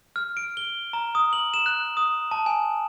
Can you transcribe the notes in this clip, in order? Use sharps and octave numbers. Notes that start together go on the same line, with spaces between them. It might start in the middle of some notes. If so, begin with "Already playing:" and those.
F6
D7
G7
A#5
D#6
F#7
E7
F#6
D#6
A5
G#5